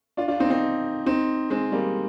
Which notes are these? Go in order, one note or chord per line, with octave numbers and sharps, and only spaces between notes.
D4 F4
D4 F4
C4 D#4
C4 D#4
C4 D#4
G#3 C4
G3 A#3